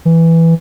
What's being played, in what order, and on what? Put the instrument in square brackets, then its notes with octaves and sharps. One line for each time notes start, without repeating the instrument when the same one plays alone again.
[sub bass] E3